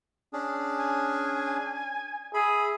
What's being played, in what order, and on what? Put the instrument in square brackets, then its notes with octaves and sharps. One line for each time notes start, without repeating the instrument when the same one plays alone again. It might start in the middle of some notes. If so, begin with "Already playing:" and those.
[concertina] C#4 D4 G#4
[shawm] G#5
[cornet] G#4 [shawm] E5 [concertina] B5